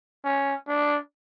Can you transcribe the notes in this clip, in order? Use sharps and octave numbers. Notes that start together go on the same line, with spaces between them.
C#4
D4